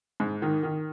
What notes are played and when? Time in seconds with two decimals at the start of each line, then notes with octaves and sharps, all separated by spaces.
0.20 G#2
0.42 D#3
0.63 D#3